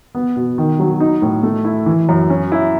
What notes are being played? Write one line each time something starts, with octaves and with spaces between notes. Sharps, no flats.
B3
B2
D#3
F#3
D#4
A2
A3
E4
E3
F#2
C#4
E4